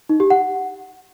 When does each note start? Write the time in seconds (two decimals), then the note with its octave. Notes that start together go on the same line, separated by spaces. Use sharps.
0.09 D#4
0.20 G4
0.30 F#5